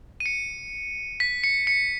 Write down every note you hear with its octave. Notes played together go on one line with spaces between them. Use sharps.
D#7
C#7
B6
C#7
C#7